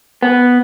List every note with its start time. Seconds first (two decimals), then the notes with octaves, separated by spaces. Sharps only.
0.23 B3